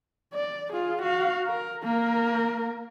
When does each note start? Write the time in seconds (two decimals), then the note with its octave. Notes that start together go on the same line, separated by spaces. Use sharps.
0.34 D5
0.73 F4 G#4
1.02 F#4 F5
1.47 A#4
1.83 A#3 A#4